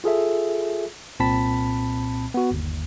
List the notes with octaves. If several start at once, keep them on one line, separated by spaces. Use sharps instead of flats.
F4 G#4 A4 E5
C2 A#2 C4 A5 B5 B6
B3 F#4
G1 D#2